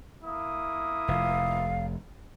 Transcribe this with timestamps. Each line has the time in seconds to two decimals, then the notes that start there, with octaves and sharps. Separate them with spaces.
0.23 A#3 E4 D#6
1.08 F1 F5